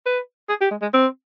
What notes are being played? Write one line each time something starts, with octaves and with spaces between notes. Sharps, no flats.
B4
G#4
G4
G#3
G#3
C4